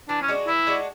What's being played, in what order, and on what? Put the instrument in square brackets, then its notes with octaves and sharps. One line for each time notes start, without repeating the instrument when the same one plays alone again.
[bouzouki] E3 [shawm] D4
[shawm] C#4
[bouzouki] G#3 D4 F#4
[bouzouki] E3 [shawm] E4
[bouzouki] G#3 D4 F#4